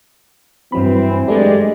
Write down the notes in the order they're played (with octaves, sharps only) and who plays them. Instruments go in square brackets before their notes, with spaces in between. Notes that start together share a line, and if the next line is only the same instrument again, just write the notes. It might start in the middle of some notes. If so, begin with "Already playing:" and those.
[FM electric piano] G2 F#3 B5 [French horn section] E3 C4
[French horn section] G#3 G4 D5 [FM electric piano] A3 D4